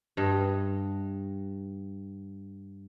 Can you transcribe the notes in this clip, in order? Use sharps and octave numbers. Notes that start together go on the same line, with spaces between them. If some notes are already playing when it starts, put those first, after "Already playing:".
G2 D#5